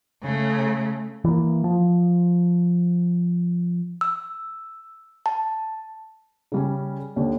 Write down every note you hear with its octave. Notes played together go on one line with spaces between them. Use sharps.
C#3 A3
E3 A#3
F3
E6
A5
C#3 G3 C#4
D#2 D3